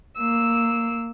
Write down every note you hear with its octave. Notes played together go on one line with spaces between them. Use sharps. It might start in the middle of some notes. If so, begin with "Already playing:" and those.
A#3 E6